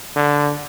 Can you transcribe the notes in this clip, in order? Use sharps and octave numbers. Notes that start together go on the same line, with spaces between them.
D3